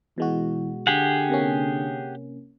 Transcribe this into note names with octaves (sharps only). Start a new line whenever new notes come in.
B2 E3 G#3 F#4
D3 G4 G#4 F#5
C3 A#3 C#4